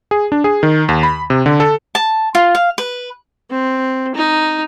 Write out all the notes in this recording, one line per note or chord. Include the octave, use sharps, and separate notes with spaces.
G#4
D4
G#4
D#3
D#2
B5
C3
D3
A4
A5
F4
F5
B4
C4
D#4